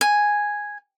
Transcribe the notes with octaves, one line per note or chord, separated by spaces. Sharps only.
G#5